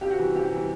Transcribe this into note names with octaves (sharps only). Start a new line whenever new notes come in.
C3 G4
F#4
E3 G3
C3 G4
E3 G3